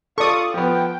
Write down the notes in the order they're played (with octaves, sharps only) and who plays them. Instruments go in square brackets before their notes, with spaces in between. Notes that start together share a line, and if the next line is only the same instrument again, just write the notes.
[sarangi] F4 [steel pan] A4 D5 [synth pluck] C#6 D#6
[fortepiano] F3 B3 [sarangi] G5